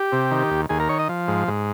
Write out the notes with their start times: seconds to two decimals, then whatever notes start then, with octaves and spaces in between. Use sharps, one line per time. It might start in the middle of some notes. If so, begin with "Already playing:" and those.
Already playing: G4
0.12 C3
0.31 D#3
0.51 D#2
0.69 D#2 G#4
0.80 A#4
0.89 D#3 C#5
0.99 D#5
1.09 F3
1.28 G#2
1.48 G#2